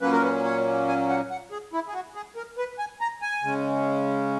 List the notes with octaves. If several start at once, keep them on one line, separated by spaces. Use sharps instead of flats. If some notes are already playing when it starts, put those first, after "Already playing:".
A#2 F#3 A#3 C#4 B4
A#4
B4
C#5
G#5
F#5
F#5
G#4
E4
G#4
F#4
G#4
A#4
B4
G#5
A#5
G#5
C#3 G#3 C#4